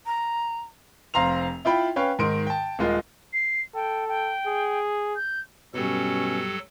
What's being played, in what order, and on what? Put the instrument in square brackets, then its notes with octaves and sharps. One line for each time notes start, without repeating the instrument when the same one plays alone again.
[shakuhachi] A#5
[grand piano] F1 C4 F5 A#5 C6 F7
E4 F4 G5 B5
C#4 B4 C#5 F5 G5
G#2 D#3 A#4 C6 D7
G5 A5
D#1 G#3 F4 A#4
[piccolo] C7
[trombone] A4 [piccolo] G5
[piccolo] G5
[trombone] G#4
[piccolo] G6
[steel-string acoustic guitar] G2 G3 [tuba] B2 [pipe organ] F#3 A4 [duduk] C#4